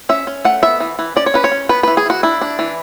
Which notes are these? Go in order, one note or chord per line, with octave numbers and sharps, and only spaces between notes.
C#4 E5
C#4
A3 F#5
B3 E5
E3
E3
C#4 D5
C#5
C#4 B4
C#5
C#4
B3 B4
E3 B4
G#4
E3 F#4
D4 E4
D4
E3